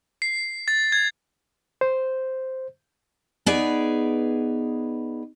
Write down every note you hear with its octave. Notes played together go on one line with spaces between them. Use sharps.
C7
A6
G#6
C5
B3 D#4 G#4 B4 D5